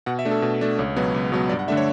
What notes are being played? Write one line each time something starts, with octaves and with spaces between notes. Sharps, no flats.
B2 F#5
E5
A3 D4
A4
B2
A3 D4
C#2 C#5
B2 F#3 B3
C#2
B2 F#3 B3
G2 D5
F#5
D3 A3 D4 E5
C#5